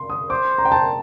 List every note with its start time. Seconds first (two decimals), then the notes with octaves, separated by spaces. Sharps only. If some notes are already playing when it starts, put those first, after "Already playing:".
Already playing: C6
0.10 D#6
0.30 C5 D6
0.58 A#5
0.65 G5
0.72 A5